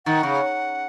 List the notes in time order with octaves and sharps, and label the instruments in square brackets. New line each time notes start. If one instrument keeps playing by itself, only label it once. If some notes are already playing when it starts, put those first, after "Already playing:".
[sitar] D#3 [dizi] F#5
[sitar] C#3